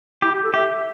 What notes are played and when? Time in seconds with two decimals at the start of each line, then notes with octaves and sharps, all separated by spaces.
0.22 E4 G4
0.33 G4
0.43 A4
0.54 G4 E5